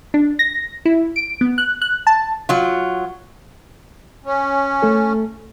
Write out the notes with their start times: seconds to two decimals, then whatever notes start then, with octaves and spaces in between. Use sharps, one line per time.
0.14 D4
0.39 A#6
0.85 E4
1.16 D7
1.41 B3
1.58 F#6
1.82 F#6
2.07 A5
2.49 F#3 F4
4.25 C#4
4.82 A3 A4